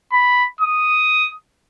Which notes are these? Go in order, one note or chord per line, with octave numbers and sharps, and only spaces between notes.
B5
D#6